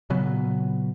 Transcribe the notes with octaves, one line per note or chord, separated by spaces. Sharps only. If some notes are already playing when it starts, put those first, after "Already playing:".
A#2 C#3 F#3 B3